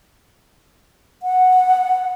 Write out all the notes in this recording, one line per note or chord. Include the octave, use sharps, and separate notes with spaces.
F#5